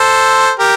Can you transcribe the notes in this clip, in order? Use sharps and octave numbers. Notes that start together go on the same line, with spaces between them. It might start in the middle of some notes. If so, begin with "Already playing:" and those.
Already playing: A4 C5
G4 A#4